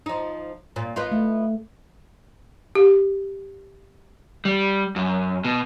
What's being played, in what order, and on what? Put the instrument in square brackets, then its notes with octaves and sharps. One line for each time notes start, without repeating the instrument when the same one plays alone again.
[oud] F3 D#4
A#2
B3 D#4 F4
[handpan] A3
[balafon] G4
[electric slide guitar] G3
F#2
B2